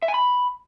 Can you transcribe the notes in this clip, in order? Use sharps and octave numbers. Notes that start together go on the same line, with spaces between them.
E5
G#5
B5